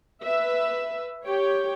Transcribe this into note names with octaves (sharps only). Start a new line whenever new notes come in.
B4 E5
G4 C#5 G5